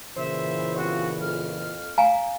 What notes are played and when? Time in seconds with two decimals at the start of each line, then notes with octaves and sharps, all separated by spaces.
0.17 A#2 C#3 E3 C5 E5
0.76 C4 F4 F#4
1.20 F2 F6
1.98 F5 G#5 A#5